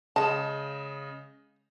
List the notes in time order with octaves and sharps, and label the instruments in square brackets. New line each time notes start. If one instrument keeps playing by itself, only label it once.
[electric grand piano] C#3 D#5 E7 [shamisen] G#3 A5